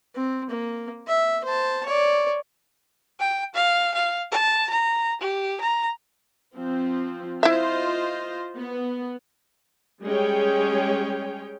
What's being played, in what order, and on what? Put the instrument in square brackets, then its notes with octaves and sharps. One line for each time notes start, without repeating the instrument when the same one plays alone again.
[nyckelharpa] C4
A#3
E5
C5 A5
C#5 D5
[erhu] G5
F5
F5
A5
A#5
G4
A#5
[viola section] F3 C4
[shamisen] E4 E5 [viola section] F4 C5 D#5
[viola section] B3
G3 G#3 C#4 G#4 C#5 G5